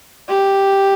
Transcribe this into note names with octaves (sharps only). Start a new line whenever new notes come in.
G4